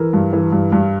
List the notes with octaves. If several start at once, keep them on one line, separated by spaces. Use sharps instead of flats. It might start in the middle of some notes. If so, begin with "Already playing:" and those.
Already playing: E3 A#4
G2
E3
G2
G2